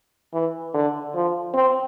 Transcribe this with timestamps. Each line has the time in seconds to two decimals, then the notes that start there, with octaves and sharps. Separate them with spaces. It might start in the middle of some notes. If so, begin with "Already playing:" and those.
0.34 E3
0.74 D3
1.14 F3
1.54 C4